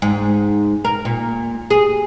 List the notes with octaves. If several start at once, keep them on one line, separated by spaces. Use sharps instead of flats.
G#2
A#4
A#2
G#4